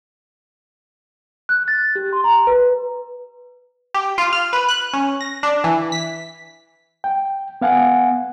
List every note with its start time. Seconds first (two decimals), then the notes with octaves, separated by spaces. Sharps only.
1.49 F#6
1.68 A6
1.95 G4
2.13 C6
2.24 A#5
2.47 B4
3.94 G4
4.18 F4
4.33 F6
4.53 B4
4.69 F#6
4.93 C#4
5.21 A#6
5.43 D4
5.64 E3
5.92 B6
7.04 G5
7.61 B3 F5 F#5 G#5